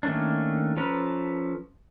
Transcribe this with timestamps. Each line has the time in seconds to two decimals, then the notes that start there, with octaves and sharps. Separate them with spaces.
0.03 D#3 A3 A#3 C#4 D4
0.77 F3 C#4 A4 B4 A#5